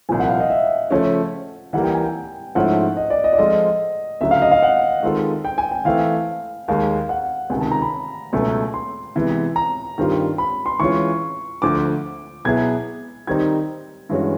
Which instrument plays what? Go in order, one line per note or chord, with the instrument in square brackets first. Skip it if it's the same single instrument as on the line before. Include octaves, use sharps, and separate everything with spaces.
[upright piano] C2 A#2 F3 [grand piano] G#5
[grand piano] F#5
F5
D#5
E5
[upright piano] C#3 F3 A3 C#4
[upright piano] E3 G3 A#3 [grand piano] F#5
[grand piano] G5
G#5
G5
[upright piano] G#2 F3 A3 C#4 E4 [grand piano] F#5
[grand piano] D#5
D5
D#5
D5
[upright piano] F3 G#3 C4 F4 A4 [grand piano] D#5
[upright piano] D2 C#3 F#3 [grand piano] E5
[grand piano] F5
D#5
F5
F#5
[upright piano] D#3 G#3 C4 F4 A4
[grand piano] G5
G#5
G5
[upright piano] E3 A3 C4 [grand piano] F5
[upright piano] D#2 D#3 G#3 [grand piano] F5
[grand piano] F#5
[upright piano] C#2 C3 D#3 [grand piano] G#5
[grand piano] A5
A#5
B5
[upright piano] C#2 B2 F#3 A3
[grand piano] C6
[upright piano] C3 E3 G#3 B3
[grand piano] A#5
[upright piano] G2 D#3 G3 C4 F4
[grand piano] B5
C6
[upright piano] E3 G#3 C#4 F4 [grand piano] C#6
[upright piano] D2 D3 F3 [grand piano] D6
[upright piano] B2 F#3 B3 E4 G#4 [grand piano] G#6
[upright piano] D#3 G3 C4 D#4 [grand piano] G#6
[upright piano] G2 E3 G#3 C#4 F#4